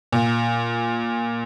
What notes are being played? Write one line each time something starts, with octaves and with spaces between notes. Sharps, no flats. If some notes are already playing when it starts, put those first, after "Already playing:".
A#2